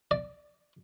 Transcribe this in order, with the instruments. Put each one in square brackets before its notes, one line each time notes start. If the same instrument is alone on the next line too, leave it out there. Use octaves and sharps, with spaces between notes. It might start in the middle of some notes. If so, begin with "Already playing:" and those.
[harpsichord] D5